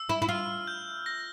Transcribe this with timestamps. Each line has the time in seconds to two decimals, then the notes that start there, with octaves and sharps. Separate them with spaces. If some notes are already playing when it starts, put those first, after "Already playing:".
Already playing: E6
0.09 E4
0.22 E4
0.28 F4 F6
0.67 G6
1.06 A#6